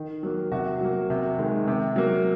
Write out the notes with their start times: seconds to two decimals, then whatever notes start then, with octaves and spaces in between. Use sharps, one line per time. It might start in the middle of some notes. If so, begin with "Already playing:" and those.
Already playing: D#3
0.23 F#3 A#3
0.52 C3 F#4
0.81 F#3 A#3
1.10 C3
1.39 D#3 G#3
1.67 C3
1.96 F#3 A#3